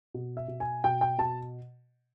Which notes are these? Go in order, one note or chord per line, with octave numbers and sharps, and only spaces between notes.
B2
E5
B2
G#5
B2 G5
G5
B2 A5